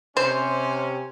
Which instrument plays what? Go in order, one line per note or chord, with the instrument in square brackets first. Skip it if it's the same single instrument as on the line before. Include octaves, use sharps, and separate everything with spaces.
[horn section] C3 C#4 [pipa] C5